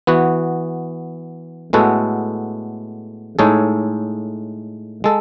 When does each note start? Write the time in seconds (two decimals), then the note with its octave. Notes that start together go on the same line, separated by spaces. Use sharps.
0.07 E3 B3 F#4
1.73 A2 G#3 B3 F#4 A4
3.39 A2 G#3 D#4 A4 C#5
5.04 G#3 A4